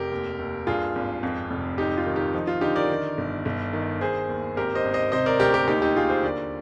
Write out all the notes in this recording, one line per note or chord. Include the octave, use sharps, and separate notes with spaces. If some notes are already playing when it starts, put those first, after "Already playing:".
Already playing: F1 G4 A#4
D#2
D#2
G2 F4 G#4
G#1
F2
F1
G#2 D#4 G4
F4
D#3
D#4 G4
F3 D#4
F4
D3 D#4 G4
A#4 D5
D#3
G1
G1
D#3
D#3 G#4 C5
D#2
G#1 G4 A#4
C5 D#5
G#1
C5 D#5
C3 C5 D#5
A#4 D5
D2 G4 A#4
G4 A#4
D#2 D#4 G4
D#4 G4
D#2 F4 G#4
G#4 C5
D3 A#4 D5